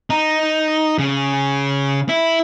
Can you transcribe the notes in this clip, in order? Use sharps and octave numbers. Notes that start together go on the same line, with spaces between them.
D#4
C#3
E4